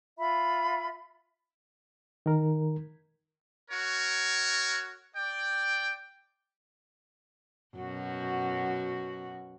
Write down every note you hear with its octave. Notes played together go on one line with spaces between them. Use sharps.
F4 E5 B5
D#3 A#4
F#4 A#4 C#5
D5 G5
F#2 B2 F#4